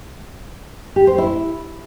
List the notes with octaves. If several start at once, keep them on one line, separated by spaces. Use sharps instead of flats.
G4
C5
E4